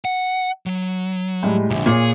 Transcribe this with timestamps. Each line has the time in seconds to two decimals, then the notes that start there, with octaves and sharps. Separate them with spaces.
0.05 F#5
0.66 F#3
1.43 A2 G3 G#3
1.70 A#1 G#2 D3
1.86 A#2 G#4 C#5